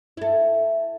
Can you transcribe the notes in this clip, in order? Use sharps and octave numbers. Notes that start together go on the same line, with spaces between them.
E4 A4